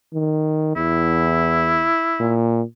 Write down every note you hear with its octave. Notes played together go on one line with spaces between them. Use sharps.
D#3
E2 E4
A#2